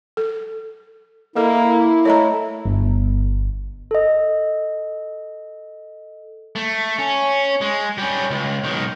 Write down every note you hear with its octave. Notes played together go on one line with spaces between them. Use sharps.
A4
A#3 E4 A4 D#5
A3 C#5 D#5 A#5
G1
A4 D#5
A3
C#4
G#3
G3 C#4
C#2
B1 D#3